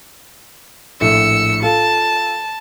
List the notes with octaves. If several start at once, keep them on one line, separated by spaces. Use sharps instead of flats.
A#1 A2 A3 E6 C#7
F4 A4 A5